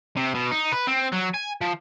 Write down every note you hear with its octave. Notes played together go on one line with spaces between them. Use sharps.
C3
B2
D#4
B4
C4
F#3
G#5
F3